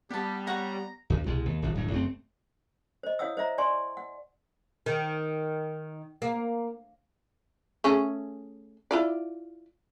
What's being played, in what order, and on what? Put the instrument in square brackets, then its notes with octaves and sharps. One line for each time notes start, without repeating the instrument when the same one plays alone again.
[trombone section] G3 [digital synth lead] B3 [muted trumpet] G4 [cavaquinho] B4 A5
[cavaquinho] C#5 F#5 [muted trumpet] A#5
[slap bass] D2
C2 B2 G#3
D#2
D#1 G#1
D1 G2
F#1 A3 C4
[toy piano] C5 D#5
E4 C#5 F5 F#5 D#6 E6
C5 D#5 E5 A#5
D5 G#5 C6 C#6
F#5
[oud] D#3
A#3
[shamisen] A3 C#4 G#4
E4 F4 D5